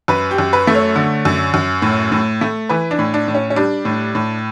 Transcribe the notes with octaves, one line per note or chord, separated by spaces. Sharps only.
F#2 B4
G4
F#2
B4
A3
C#5
D3
F#2
F#2
A2
A2
A3
E3 B4
D4
A2
D4
A2
C#4
C#4
G3 D4
A2
A2